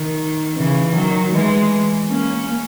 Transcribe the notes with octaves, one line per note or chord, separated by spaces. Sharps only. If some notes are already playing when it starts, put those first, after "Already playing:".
Already playing: D#3
C#3 E3
D#3 F#3
E3 G#3
A#3 C#4